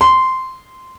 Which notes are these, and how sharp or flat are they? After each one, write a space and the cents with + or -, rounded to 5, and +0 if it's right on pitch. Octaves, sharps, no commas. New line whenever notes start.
C6 -10